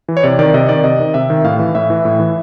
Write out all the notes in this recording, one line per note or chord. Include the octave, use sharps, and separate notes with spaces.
E3
C#5
C3 D5
D#3 D5
C3 D#5
D#3 D5
C3 D#5
D#3
C3 E5
D#3
A2 F5
E3
A2 E5
E3
A2
E3